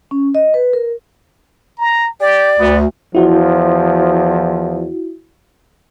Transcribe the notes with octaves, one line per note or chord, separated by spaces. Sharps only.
C#4
D#5
B4
A#4
A#5
G4 D5
D2 B3
E2 F3 E4 F#4